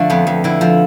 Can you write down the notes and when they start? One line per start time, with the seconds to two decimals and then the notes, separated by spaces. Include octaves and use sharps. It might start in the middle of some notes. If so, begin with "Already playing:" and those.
Already playing: D3 F3 A3 D4
0.10 F2 B3
0.27 F2
0.44 D3 E4
0.61 F3